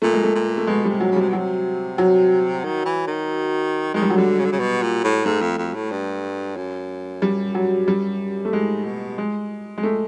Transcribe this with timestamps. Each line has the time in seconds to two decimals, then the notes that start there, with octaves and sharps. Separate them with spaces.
0.02 A#2 A3
0.13 G#3
0.24 A3
0.35 A#2
0.57 A3
0.67 B2 G#3
0.85 C3 G3
1.00 F#3
1.11 C#3
1.16 C3 G3
1.29 B2
1.33 F#3
1.38 C3
1.98 F#3
2.64 D#3
2.85 E3
3.07 D#3
3.94 D#3 G#3
4.02 G3
4.10 F#3
4.17 D3 G3
4.39 C#3
4.45 D3
4.52 C#3
4.60 B2
4.82 A#2
5.03 A2
5.25 G#2 A3
5.41 F2
5.58 F2
5.74 A2
5.91 G2
6.56 F#2
7.22 G3
7.55 F#3
7.88 G3
8.45 A3
8.52 G#2 G#3
8.85 B2
9.18 G#3
9.78 G#3
9.83 A3